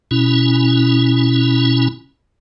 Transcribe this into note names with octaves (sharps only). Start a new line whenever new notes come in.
B2 C#4 E4